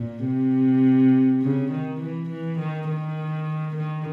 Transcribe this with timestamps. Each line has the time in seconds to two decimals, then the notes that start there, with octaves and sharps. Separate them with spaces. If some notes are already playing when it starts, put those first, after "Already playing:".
Already playing: A#2
0.25 C3
1.42 C#3
1.71 D#3
2.01 E3
2.30 E3
2.59 D#3
2.89 D#3
3.76 D#3